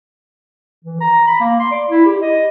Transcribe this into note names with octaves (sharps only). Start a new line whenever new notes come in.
E3
A#5
B5
A#3
C6
D5
E4
G4
D#5